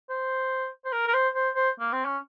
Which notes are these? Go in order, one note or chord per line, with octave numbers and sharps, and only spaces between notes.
C5
C5
A#4
A#4
C5
C5
C5
A#3
C4
C#4